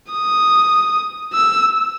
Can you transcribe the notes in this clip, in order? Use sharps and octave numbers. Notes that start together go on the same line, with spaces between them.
D#6
E6